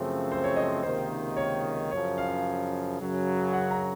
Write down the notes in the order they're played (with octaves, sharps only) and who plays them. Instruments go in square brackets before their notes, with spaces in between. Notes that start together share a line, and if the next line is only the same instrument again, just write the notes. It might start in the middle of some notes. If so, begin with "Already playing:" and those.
Already playing: [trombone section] F#2 C#3 F3 A3 C4
[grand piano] C5
C#5
D#5
[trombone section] C#2 C3 D#3 A#3 [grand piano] C5
[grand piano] C#5
[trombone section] F#2 C#3 F3 [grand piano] C#5
[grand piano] F5
[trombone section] F#2 C#3 F#3
[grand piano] F#5
A#5